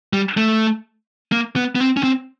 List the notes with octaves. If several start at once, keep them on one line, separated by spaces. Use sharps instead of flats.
G3
A3
A#3
B3
B3
C4
C#4
C4